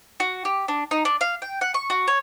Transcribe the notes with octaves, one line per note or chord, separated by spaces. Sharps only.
F#4
G4
D4
D#4
D4
F5
G5
F#5
C#6
F#4
C#5